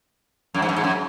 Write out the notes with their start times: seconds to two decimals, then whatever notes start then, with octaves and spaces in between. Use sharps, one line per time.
0.54 F#2
0.62 G#2
0.69 F#2
0.76 G#2
0.84 F#2